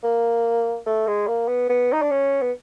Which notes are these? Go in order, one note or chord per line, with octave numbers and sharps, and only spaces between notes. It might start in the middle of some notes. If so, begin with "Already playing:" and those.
A#3
A3
G#3
A#3
B3
B3
D#4
D4
C#4
B3